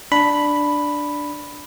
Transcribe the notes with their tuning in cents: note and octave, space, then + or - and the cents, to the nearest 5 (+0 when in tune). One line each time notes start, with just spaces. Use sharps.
D4 +0 B5 +0